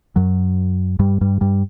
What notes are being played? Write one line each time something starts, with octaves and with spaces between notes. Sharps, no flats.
F#2 F#3
G2 G3
G2 G3
G2 G3